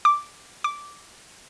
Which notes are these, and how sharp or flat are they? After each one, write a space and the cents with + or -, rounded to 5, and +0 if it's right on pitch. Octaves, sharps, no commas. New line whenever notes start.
D6 +0
D6 -5